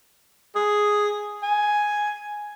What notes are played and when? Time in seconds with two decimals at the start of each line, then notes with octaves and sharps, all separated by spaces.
0.55 G#4
1.42 G#5